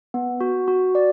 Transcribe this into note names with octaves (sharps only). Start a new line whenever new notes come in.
B3
F#4
F#4
D5